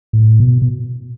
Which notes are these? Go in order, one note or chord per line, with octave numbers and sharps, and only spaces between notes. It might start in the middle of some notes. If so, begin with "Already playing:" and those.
A2
B2
B2